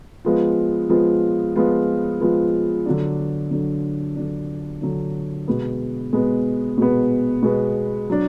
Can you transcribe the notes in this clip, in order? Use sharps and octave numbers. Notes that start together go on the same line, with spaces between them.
F3 G#3 B3 F4
F3 G#3 B3 F4
F3 G#3 B3 F4
F3 G#3 B3 F4
D3 F#3 D4
D3 F#3 D4
D3 F#3 D4
D3 F#3 D4
B2 G#3 B3
B2 G#3 B3
B2 G#3 B3
B2 G#3 B3
F#3 D4